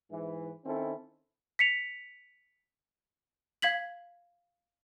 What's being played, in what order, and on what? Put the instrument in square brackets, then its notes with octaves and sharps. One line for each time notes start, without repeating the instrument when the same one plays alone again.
[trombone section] G#2 E3
D#3 C4 C#4 E4 A4
[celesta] B6 C#7 F7
[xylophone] F5 G#6 B6 F#7